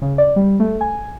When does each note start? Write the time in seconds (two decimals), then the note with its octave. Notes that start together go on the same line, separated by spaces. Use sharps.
0.02 C#3
0.18 D5
0.36 G3
0.60 A3
0.81 G#5